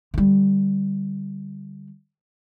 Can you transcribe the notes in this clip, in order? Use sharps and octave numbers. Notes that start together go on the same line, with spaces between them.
D3 G3